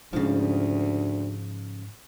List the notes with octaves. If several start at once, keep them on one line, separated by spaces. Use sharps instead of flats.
D2 G#2 C#3 F3